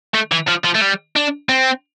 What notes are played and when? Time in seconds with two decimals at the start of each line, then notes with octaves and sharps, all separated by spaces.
0.14 A3
0.32 E3
0.48 F3
0.65 F3
0.75 A3
0.82 G3
1.16 D4
1.49 C4